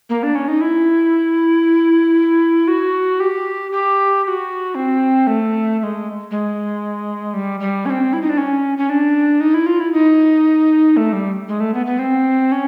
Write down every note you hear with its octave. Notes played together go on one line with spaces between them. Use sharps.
A#3
D4
C#4
D#4
E4
F#4
G4
G4
G4
F#4
C4
A3
A3
G#3
G#3
G3
G3
C#4
C4
E4
D#4
D4
C#4
C#4
D4
D#4
E4
F4
E4
D#4
A3
G3
G#3
A3
B3
B3
C4
C#4